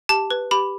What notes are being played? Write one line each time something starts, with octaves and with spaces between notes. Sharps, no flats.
G4 A5
B4
G4 B5